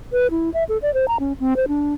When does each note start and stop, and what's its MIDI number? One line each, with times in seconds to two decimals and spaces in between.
0.13 0.27 71
0.31 0.50 64
0.54 0.64 76
0.69 0.78 69
0.82 0.93 74
0.94 1.08 72
1.08 1.17 82
1.20 1.33 61
1.40 1.56 60
1.57 1.66 72
1.68 1.94 62